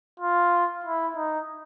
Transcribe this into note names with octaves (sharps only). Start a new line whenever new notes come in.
F4
E4
D#4